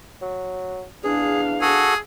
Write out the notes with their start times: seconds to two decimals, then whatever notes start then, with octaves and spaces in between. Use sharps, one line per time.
0.22 F#3
1.04 E2 D4 G#4 F5
1.61 F#4 G#4 A4